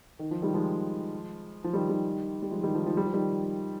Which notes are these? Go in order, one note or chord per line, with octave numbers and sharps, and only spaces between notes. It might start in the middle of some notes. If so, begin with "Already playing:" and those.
D#3
F3
D#3 G3
F3 G#3
F3
D#3 G3
D#3 G3
G3
F3 G#3
D#3 G3
F3
F3
G3
F3
D#3 G3